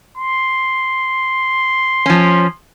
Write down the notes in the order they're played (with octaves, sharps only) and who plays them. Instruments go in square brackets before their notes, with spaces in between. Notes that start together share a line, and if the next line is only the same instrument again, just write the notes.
[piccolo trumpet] C6
[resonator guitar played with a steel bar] F3 C#4